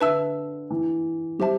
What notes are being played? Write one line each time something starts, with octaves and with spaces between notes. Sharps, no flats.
D3 B4 E5 A5 E6
E3
G3 G4 C5 E5 A5